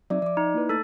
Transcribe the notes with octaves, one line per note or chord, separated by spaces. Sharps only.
F#3 C4 D#4 D5 E5 D6
F3 D5 D6
D#4
A#3 E4 B4
A3 A4 A6